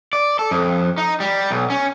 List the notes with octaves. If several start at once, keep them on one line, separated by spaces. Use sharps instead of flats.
D5
A4
F2
D#4
G3
B1
C#4